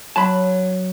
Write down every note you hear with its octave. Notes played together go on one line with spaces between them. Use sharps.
F#3 A5 B5